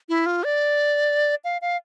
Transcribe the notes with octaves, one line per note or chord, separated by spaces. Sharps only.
E4
F4
D5
F5
F5